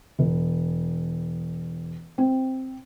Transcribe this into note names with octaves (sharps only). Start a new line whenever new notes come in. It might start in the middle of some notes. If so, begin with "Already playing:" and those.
E1
C4